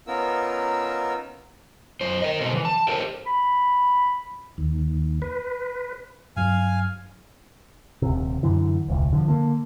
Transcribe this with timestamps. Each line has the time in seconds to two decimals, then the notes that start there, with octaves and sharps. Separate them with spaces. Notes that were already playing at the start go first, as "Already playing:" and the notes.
0.07 B3 C#4 D#4 F4 A#4 E6
2.01 F#2 C5
2.22 A#4 D#5
2.41 B2 A4 C5
2.53 C3 E3
2.65 A5
2.88 G4 A4 A#4 C5
3.26 B5
4.58 D#2
5.22 B4
6.36 G2 F#3 F5 G#5
8.02 D#1 C3
8.43 F#2 D3 E3
8.88 E1 C#2
9.13 D3 E3 F3
9.27 D3 A#3